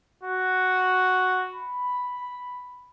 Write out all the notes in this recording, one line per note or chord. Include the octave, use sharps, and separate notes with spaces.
F#4
B5